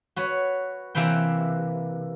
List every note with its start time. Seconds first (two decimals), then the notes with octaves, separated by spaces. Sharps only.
0.16 F#4 B4 C#5
0.95 C3 E3 A#3 B4 G5